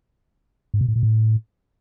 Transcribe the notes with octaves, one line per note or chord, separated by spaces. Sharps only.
G#2
B2
A2
A#2
A2